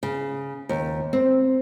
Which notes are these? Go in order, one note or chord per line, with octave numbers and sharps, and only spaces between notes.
C#3
D#2
C4